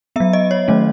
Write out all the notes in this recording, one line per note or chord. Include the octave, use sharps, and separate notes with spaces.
F#3 B3 E5
D#5
C#5
D#3 F#3 A3 C#4